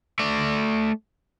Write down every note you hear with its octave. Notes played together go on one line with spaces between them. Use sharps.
A3 D5